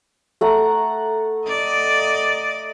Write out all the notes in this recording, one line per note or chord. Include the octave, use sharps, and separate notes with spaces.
A3 F#5 A#5
D5 D#5